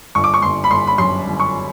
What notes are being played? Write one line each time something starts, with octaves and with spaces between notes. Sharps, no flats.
G1 C#6
D6
C#6
G1 C6
B5
G1 C6
B5
F#2 C6
G1
C#6